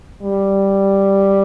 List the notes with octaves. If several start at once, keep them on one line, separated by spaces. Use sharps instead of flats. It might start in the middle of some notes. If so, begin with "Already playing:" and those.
G3